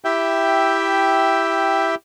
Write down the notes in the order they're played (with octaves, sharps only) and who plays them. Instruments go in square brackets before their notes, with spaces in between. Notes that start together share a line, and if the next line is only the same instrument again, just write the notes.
[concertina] E4 G4 E5 G5